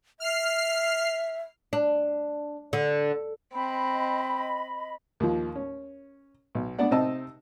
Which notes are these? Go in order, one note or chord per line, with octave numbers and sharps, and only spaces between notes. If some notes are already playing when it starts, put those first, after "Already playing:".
E5 F6 C7
D4
D3
C4 D#5 B5
D#2 F3
C#4
B1
B3 D4 D5 F#5
C3 C4 D#4 D#5 A5 E6